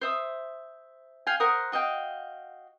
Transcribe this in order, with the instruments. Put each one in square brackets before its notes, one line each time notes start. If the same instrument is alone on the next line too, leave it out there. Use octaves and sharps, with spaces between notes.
[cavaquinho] C5 E5 D#6
F5 G5 G#5
A#4 C5 F#5 D#6
F#4 D#5 F5 G5